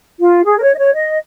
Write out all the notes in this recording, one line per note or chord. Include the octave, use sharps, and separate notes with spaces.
F4
G#4
A#4
C#5
D#5
C#5
D#5